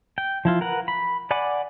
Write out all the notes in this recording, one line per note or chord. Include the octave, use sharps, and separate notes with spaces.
G5
F3 E4 F4
A#4 B4 F#5
B5
D5 F#5 G#5 B5 D6